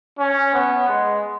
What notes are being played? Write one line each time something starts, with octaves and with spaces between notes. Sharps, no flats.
C#4
B3
G#3